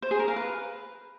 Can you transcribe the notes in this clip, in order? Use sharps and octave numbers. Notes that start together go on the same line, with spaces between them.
C5
G#4
A#4
F5
B4